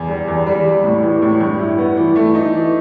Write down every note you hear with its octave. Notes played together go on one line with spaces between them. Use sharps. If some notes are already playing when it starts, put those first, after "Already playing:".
Already playing: E2
G3
E2
G3
G3
A2
E3
A2
G2
E4
B3
E3
A3
D#4
E3